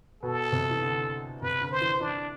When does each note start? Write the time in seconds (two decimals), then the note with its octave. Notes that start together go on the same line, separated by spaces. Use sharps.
0.23 B2 A4
0.52 C3
0.71 E3
0.82 D3
1.42 C3 B4
1.61 D3
1.71 C5
1.81 E3
2.01 E3 D4